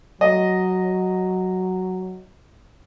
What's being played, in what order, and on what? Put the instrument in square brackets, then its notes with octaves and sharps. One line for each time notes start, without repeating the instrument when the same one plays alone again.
[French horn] F#3 [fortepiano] D#5